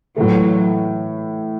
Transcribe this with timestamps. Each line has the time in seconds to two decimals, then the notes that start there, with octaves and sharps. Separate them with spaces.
0.16 A2 E3 F#3 A3